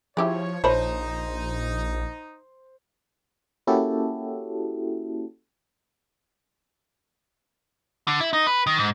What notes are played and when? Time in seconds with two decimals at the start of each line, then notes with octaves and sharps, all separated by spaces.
0.17 F3 E4 G4 G#4 C#5
0.64 A#1 F3 D#4 C5 C#5 B5
3.67 A#3 C#4 E4 F#4 G4 A4
8.08 D3
8.21 E4
8.33 D#4
8.47 B4
8.67 D#3
8.79 G#2